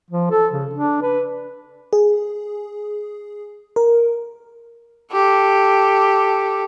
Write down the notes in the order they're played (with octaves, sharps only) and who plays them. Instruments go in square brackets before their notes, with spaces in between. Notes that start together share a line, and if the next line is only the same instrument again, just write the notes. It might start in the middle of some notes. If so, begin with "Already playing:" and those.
[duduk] F3
A4
C#3
D4
B4
[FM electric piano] G#4
A#4
[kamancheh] G4 A4